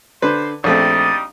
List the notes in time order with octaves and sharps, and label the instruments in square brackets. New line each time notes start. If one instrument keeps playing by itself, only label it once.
[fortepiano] D3 B4 [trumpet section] C5
[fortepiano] A#1 A3 C4 [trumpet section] G3 D#4 D#6 [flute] A6